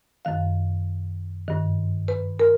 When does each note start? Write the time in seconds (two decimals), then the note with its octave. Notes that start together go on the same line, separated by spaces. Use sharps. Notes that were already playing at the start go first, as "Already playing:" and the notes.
0.25 F#2 D#3 F5
1.48 G2 D#3
2.08 B4
2.40 A#4